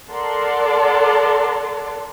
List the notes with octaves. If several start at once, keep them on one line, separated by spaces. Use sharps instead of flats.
A4 A#4 D5 F#5 A5 C6